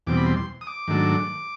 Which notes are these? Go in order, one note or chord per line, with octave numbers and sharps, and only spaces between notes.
E2 B2 G3 C4 D6
B5
C6
C6
D#6
D6
G#2 D#3 F#3 A3 D4